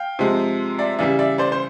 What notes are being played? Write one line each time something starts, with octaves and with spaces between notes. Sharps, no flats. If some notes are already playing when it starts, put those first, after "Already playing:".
Already playing: F5 G5
C3 F3 G#3
D5 E5
C#3 E3 G3 D5 E5
D5 E5
C5 D5
C5